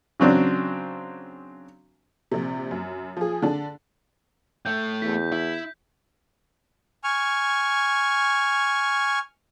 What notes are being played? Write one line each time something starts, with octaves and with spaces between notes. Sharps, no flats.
C#3 F#3 C4 D4
A#1 C3
F#2
F3 G#4
D3 D4
A2 A3 G6
E2 B6
E4
G#5 C#6 F6